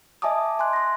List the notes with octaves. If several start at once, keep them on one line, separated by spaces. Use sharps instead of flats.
D#5 E5 G#5 A5 D6 D#6
G#5 C6 F#6
C6 A#6